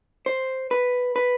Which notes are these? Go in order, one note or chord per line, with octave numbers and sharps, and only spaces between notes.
C5
B4
B4